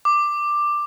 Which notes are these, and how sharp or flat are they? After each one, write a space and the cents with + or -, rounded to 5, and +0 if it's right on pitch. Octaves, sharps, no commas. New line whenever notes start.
D6 +10